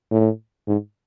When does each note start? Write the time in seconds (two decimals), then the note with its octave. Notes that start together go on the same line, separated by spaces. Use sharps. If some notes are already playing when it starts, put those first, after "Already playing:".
0.12 A2
0.68 G#2